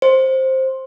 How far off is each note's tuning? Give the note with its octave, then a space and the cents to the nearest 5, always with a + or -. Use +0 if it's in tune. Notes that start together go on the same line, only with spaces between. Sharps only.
C5 +10